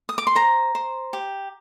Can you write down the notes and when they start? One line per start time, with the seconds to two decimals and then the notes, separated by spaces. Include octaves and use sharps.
0.09 D#6
0.18 D6
0.27 C6
0.35 C5 A#5
0.75 C5
1.13 G4